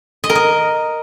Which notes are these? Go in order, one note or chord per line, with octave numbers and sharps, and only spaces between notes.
D#5
A#4
D#5